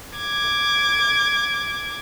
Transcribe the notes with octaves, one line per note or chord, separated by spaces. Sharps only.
D6 G#6